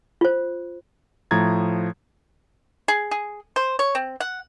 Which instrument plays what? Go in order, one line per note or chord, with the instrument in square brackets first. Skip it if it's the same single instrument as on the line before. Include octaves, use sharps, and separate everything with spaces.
[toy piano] F4 C5
[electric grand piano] A2 F3 A#5 G#6 A6
[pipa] G#4
G#4
C5
C#5
C4
F#5